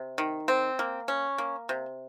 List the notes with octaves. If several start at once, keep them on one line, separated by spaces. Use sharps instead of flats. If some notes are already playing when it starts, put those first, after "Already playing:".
Already playing: C3
D#3
C4
A#3
C#4
A#3
C3